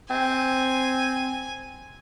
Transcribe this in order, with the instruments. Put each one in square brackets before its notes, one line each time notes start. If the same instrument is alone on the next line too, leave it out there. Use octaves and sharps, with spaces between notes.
[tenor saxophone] C4 [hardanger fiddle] G#5